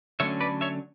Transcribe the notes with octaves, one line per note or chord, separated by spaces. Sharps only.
D3 F#3 A3 C#4 C#5 E5
B4 D5
C#5 E5